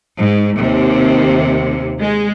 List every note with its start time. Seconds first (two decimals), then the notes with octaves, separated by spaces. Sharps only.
0.21 G#2
0.57 D#2 C3
2.00 G#3